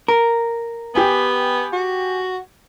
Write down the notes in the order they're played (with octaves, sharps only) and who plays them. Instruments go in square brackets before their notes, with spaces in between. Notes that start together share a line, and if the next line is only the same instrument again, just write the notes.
[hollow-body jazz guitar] A#4
[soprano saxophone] B3 [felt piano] G4 G5 G#5
[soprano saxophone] F#4